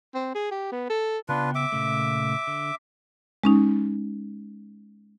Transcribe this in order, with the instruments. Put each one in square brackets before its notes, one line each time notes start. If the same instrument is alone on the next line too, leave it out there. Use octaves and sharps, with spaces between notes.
[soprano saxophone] C4
G#4
G4
B3
A4
[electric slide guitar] C#3 B3 G5 [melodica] D4 F4 B4
[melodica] E5 D6
[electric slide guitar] A#2 C#3 A3
D3
[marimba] G#3 C#4 D#4